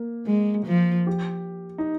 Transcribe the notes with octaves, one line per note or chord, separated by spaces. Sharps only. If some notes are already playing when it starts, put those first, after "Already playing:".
Already playing: A#3
G#3
F3
G4
D#4